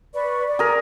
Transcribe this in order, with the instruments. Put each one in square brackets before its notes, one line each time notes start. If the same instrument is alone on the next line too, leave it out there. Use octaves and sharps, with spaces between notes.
[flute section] B4 D5 C#6
D5
[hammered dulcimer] G#4 A#4